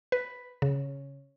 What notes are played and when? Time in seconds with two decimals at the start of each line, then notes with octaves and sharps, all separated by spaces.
0.12 B4
0.62 C#3